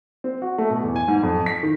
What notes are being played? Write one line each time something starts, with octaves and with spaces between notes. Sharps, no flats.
C4
F#4
A3
B2
E2
G#5
G#2
F2
B6
D#3